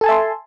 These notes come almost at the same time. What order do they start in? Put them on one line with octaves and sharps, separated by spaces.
A4 G#5 A5 E5 C6